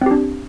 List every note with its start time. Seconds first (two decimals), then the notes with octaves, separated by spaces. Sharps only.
0.02 C4
0.06 G4
0.11 D4